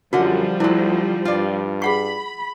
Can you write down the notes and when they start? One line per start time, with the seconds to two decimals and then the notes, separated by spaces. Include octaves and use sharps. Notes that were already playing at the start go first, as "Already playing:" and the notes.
0.13 F#2 D3 F3 G3 F#4 A#4 F#5
0.60 D2 D3 F#3 E4
1.25 G2 F4 D5
1.82 G#4 F#5 B5 C#6